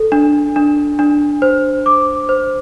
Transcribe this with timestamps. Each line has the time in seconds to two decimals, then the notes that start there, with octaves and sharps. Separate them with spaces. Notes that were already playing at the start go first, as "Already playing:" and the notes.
Already playing: A4
0.12 D4
0.56 D4
0.99 D4
1.42 C5
1.86 D6
2.29 C5